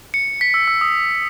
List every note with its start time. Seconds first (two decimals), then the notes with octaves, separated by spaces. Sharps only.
0.14 C#7
0.41 B6
0.54 E6
0.68 E6
0.81 D#6